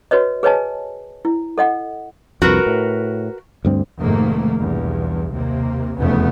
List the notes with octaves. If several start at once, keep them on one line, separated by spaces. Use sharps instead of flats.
F#4 B4 C#5 D#5
G#4 B4 C#5 D#5 G#5 A5
E4
A4 D#5 F#5
C2 F2 F#4 A#4 B4
A2
D2 G2 C4
F1 G#2 D#3 A3 A#3
B1 E2 G2
D#2 C3 A#3
F1 E2 C#3 A3 B3